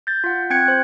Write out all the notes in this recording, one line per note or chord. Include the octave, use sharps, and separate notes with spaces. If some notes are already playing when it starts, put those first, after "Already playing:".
G6 A6
F4 F#5
C4 G5 F#6 G#6 C#7
C5